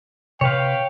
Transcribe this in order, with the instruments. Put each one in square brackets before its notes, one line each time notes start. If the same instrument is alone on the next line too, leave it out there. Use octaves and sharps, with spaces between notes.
[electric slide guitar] C3 B4 [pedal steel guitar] C#5 F5 [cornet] G5